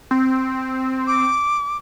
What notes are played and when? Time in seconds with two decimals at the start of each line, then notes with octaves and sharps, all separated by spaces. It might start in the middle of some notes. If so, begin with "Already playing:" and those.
0.11 C4
1.07 D6